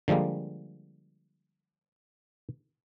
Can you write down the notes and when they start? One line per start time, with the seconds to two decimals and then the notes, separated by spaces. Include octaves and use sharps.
0.08 D3 F3 G3 G#3 A#3